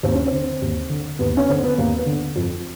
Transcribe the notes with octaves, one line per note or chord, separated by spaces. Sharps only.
D#2 C4
C#4
C4
D3
D#2
D3
D#2 B3
C#4
D3 C4
B3
D#2 A#3
B3
D3
F2